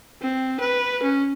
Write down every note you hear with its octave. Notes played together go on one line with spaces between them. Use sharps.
C4
B4
C#4